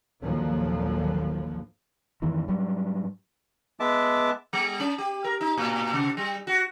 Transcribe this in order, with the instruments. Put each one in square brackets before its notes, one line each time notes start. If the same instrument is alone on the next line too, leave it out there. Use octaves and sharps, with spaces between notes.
[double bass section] G#1 D#2 A#2 D3 F3 F#3
[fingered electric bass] F2 G#2 D#3 E3
G#2 F#3 G3
[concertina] G#3 B3 E5 A5 D6
[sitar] G3
C#4
G4
A#4
D#4
A2
C3
G3
F#4